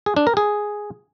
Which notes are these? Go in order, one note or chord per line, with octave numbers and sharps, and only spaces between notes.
G#4
D4
A#4
G#4